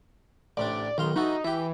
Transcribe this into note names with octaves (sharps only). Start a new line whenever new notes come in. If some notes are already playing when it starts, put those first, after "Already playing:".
A1 C3 D4 D5
B1 D#3 F5 C6
E3 D#4 F#4 A4
E3 G4 E5